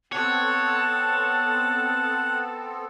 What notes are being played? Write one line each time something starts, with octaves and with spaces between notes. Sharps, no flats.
B3 C4 A4 C#5 F#5 A5